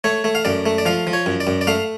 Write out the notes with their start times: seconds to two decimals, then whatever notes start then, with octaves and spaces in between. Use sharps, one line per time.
0.04 A3 C#5
0.24 A3
0.35 F5
0.45 F#2 D5
0.66 A3
0.78 D5
0.86 F3 F5
1.07 F3
1.13 C#5
1.26 F#2
1.40 D5
1.47 F#2
1.61 D5
1.67 A3 F5